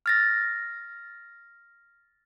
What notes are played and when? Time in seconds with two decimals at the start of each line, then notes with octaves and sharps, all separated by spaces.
0.06 F6 A6 A#6